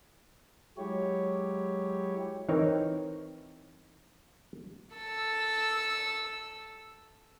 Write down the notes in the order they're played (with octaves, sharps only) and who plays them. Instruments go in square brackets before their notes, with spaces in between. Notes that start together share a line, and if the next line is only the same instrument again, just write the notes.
[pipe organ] F#3 G#3 E4 G4 C#5
[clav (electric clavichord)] E3 C4 D#4 A#4 C#5
[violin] A4 E6